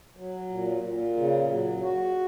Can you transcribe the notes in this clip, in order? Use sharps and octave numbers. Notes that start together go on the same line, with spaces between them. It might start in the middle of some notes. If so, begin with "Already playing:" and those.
F#3
A#2
A#2
C#3
F#3
F#4